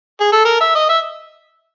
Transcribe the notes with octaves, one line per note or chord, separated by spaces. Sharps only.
G#4
A4
A#4
E5
D#5
E5